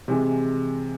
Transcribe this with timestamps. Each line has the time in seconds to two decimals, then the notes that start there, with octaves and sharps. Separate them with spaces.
0.08 C3 E3 G#3